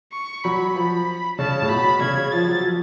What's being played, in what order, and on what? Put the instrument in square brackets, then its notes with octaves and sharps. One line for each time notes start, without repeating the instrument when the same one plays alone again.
[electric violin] C#6
[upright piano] F#3 [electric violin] B5
[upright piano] F3
[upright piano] C#3 [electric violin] A5
[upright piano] A2
[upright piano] B2 [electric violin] B5
[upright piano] C#3 [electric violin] G#6
[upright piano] F3 [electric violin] A6
[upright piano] F#3
F3